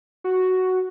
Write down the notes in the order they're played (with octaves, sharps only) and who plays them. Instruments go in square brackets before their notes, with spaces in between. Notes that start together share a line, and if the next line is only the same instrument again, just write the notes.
[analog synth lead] F#4